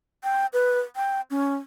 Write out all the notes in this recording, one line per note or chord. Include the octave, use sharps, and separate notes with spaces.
G5
B4
G5
C#4